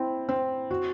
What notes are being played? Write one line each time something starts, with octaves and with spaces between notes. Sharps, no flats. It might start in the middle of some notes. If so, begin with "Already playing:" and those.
Already playing: C4 E4
C4
F#4